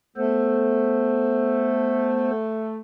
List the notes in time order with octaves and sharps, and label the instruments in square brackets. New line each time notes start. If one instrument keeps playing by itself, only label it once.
[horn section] A3 [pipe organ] B3 A4 C5